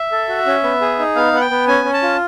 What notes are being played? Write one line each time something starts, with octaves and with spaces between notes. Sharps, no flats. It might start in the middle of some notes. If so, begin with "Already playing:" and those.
Already playing: E5
A4
F#4
C#4
B3
G#4
D#4
B3 F5
B3 F#5
G5
B3
C#4 G#5
C#4
A5
F4